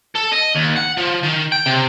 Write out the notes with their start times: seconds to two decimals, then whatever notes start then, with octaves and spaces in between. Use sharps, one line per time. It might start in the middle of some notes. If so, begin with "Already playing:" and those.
0.15 A4
0.32 D#5
0.55 D#2
0.77 F#5
0.97 F3
1.23 D#3
1.52 G5
1.66 C3